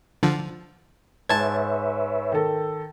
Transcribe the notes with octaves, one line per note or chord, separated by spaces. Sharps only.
D3 F3
G#2 B4 C#5 E5 A5 G#6
D#3 A4